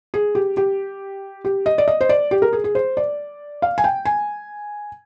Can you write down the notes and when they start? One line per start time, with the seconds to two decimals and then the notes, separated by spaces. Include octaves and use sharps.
0.14 G#4
0.35 G4
0.57 G4
1.45 G4
1.66 D#5
1.78 D5
1.88 D#5
2.01 C5
2.09 D5
2.31 G4
2.42 A#4
2.53 G#4
2.64 G#4
2.75 C5
2.97 D5
3.62 F5
3.78 G#5
3.84 G5
4.05 G#5